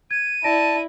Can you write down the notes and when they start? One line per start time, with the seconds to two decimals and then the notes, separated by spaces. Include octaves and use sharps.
0.11 G#6 D#7
0.44 E4 D5 A5 A#6 D7